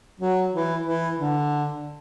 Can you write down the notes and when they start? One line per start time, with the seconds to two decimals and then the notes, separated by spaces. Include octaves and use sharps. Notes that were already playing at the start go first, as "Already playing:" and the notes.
0.20 F#3
0.54 E3
0.86 E3
1.20 D3